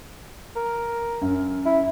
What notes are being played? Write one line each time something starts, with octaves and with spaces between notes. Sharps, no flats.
A#4
F#2
E4